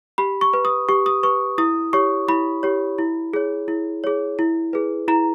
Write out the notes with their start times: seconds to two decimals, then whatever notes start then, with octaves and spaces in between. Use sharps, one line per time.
0.18 G4 B5
0.41 C#6
0.54 B4
0.65 D#6
0.89 G4 C#6
1.06 D#6
1.23 B4 C#6
1.58 E4 D#6
1.93 G4 C#5 C#6
2.28 E4 B5
2.63 G4 C#5
2.98 E4
3.33 G#4 C#5
3.68 E4
4.04 G#4 C#5
4.39 E4
4.73 G#4 B4
5.08 E4 A#5